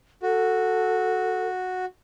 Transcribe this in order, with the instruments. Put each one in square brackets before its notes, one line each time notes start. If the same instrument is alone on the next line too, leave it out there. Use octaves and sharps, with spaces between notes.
[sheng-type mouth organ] F#4 [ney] A4